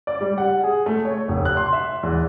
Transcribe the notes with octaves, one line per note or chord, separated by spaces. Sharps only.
D5
G3
F#5
G#4
A3
C#5
F1
F#6
C6
E5
E2